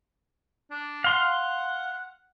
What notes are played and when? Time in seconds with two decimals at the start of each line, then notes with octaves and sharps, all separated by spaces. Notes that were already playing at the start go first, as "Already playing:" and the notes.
0.71 D4
1.04 F5 F#5 C6